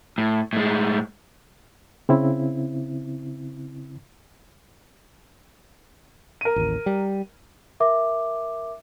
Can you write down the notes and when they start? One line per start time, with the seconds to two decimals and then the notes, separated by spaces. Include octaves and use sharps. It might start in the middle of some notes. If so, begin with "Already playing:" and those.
0.18 A2
0.53 A2 G#3
2.09 C#3 C4 E4
6.41 A#4 D#7
6.56 A1 D#2
6.86 G3
7.80 A#4 E5 D6